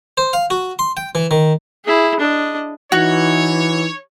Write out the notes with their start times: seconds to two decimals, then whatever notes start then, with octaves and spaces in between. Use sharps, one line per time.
0.17 C5
0.33 F5
0.50 F#4
0.79 C6
0.97 G5
1.15 E3
1.31 D#3
1.85 E4 G#4
2.20 D4 D#5
2.92 E3 D#4 F#4 C#5